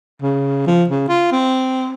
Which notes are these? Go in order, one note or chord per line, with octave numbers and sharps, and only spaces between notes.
C#3
F3
C#3
F4
C4